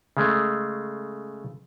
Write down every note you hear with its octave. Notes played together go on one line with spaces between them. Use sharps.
C#3 G#3 A3